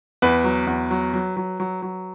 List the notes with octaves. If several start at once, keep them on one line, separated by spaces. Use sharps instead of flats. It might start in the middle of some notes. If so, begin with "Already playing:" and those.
E2 B4
F#3
E2
F#3
F#3
F#3
F#3
F#3